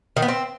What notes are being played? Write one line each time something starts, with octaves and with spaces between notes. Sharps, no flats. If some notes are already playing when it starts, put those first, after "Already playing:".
D#3
B3
C4